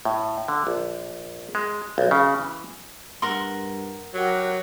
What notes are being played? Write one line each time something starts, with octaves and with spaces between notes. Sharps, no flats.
A2
D3
A#1
G#3
B1
C#3
E3
G2 A#4 F#5 C6
F#3 G4 A#4 F#5